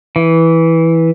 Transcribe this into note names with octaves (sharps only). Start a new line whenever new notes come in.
E3